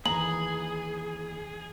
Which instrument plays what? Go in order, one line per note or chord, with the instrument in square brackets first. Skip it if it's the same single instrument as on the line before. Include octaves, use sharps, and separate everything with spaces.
[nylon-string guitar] D#2 E3 [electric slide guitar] G#4 [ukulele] A#5 [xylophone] F#7